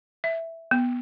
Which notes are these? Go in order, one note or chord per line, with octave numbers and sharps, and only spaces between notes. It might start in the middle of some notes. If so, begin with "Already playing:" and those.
E5
B3